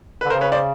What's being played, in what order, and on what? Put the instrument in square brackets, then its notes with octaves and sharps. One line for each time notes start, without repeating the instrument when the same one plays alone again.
[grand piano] B4
[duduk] D3
[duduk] C#3 [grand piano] A#4 C5
[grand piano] B4 C#5
C5 D5